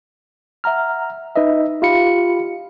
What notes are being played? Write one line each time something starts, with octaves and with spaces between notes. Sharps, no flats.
E5 F#5 A#5 F6
D#4 B4 D#5 E5
F4 G4 F5 B5 C#7